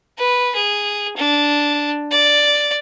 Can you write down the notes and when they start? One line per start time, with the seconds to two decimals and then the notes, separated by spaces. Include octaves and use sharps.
0.18 B4
0.55 G#4
1.17 D4
2.11 D5